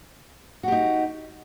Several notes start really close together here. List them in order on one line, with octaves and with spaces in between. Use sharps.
F#4 G4 D#4